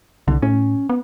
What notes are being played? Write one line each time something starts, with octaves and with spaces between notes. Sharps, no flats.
C2 D3
A2 C#4
B3